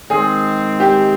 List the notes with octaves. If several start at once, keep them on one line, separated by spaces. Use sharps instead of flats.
D#3 G#3 C4 G#4
G4